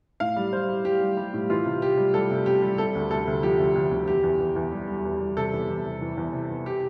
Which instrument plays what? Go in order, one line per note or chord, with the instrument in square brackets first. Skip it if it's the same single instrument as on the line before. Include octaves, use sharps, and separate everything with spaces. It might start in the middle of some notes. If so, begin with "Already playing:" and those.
[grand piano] A2 F5
G3
G3 C5
G3
G3 G4
G3
G3
A2
E3 F4
C3
C3 G4
G3
G3 A4
C3
C3 G4
G3
C3 A4
D2
D2 A4
D2
F3 G4
D2
D2
D2
E2 G4
E2
E2
E2
G3
G3
E2
G3
C3 A4
E2
E2
C3
E3
E2
C3
E2
G4